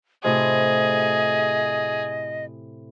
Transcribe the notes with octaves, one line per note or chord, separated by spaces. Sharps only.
A2 C3 F#4 G#4 D#5